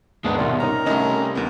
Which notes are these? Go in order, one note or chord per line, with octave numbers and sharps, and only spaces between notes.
D#2 G#2 G#3 B3 D4
C2 B2 D#3 F4 D5
C#4 D#4 A#4
C2 A3 C#4 D#5
D#2 B3